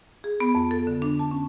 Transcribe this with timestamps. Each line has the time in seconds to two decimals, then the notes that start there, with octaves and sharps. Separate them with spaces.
0.24 G#4
0.40 B3
0.55 F2
0.71 A4
0.87 D3
1.02 D4
1.19 A5
1.31 C#4